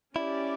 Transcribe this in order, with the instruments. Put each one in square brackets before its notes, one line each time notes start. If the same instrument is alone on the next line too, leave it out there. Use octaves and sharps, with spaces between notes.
[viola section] C#4 G4 D5 [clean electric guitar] E4